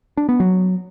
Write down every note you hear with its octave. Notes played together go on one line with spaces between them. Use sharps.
D4
B3
F#3